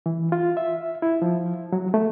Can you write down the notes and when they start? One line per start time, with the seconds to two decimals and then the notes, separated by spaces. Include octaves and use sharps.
0.06 E3
0.32 F4
0.57 E5
1.02 E4
1.22 F3
1.72 F#3
1.94 A3